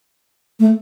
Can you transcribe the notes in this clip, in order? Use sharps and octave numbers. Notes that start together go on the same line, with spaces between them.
A3